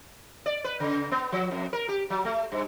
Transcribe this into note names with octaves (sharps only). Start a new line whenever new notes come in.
D5
B4
C#3
B3
F3
F2
A#4
G4
F#3
A3
G2